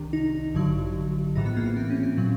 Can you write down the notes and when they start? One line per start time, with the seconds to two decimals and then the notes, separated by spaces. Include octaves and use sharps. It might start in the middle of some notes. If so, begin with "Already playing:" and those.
Already playing: C2 C3 D#3 D4
0.13 D#4
0.54 A1 G2 D3 F#3
1.36 A#1 A2 E3 D#4
1.46 B3
1.57 A#3
1.66 B3
1.76 C4
1.90 C#4
2.03 C4
2.17 A#2 F#3